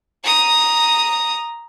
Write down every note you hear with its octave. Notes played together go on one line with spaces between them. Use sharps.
A#5 D#6